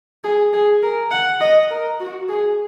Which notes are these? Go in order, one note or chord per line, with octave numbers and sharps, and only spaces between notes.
G#4
G#4
A#4
F#5
D#5
A#4
F#4
G#4